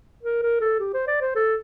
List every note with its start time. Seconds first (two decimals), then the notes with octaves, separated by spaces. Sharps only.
0.23 A#4
0.43 A#4
0.61 A4
0.80 G4
0.94 C5
1.07 D5
1.21 C5
1.35 A4